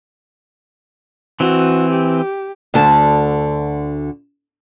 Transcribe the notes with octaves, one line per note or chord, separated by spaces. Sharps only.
E3 C4 F#4
G4
D2 D3 A5